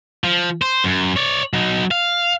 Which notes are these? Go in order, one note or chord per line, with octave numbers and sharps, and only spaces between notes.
F3
C5
F#2
C#5 D5
F#3 D#4
F5